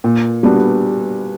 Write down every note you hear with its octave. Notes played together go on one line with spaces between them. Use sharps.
A#2
G3 B3 D4 F#4